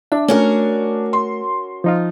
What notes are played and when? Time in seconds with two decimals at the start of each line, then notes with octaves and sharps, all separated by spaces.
0.12 D4 E5
0.28 A3 C#4 F#4 A#4
1.13 C6
1.84 F3 D#4 F4